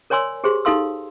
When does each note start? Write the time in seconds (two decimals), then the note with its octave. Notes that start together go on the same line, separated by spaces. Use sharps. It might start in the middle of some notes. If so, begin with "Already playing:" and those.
0.10 A#4 C#5 D5 G#5 C6 E6
0.44 G4 G#4 C5 C6
0.65 D#4 G4 A4 F5 C6 E6